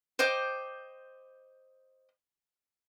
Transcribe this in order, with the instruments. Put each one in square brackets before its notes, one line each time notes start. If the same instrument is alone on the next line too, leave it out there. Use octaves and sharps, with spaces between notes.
[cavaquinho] C5 D#5 G5 D6